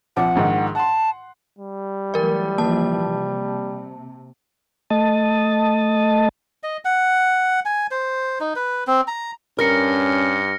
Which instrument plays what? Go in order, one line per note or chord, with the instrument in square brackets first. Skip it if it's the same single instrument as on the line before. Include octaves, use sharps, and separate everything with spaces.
[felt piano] C2 F3 D6 [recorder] F#5
[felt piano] A#1 G#2 D#3
[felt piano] F#5 C6 [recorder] A5
[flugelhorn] G3
[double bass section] E3 F#3 A3 [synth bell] A#4 D5
[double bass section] C#3 E3 F3 [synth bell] A#3 A5
[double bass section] C3
[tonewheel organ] A3 D#5 A5
[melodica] D#5
F#5
G#5
C5
D#4
B4
C4
A#5
[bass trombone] G2 [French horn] C#4 [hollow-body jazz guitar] A#4 [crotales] F6 A#6 C#7